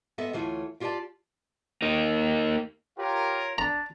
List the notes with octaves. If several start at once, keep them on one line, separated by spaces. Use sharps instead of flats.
G#3 B3 A4 D#5 E5
D2 E3 A3 F4 C#5
E4 F4 G4 B4 D5 A5
A#3 D#4
F4 G4 A#4 C#5
D4 D5 A#5